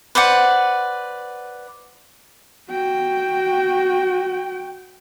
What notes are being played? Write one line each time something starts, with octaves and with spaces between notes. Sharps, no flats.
B4 C5 D5 F#5
F#4 G5